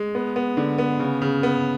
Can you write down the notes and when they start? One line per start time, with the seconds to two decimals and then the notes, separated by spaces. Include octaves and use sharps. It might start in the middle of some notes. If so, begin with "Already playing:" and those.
Already playing: G#3
0.15 B3
0.36 B3
0.57 D3
0.78 B3
1.00 C#3
1.22 C#3
1.43 B3